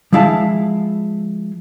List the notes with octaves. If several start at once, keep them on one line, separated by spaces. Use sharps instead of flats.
F3 G#3 E4 F5 A5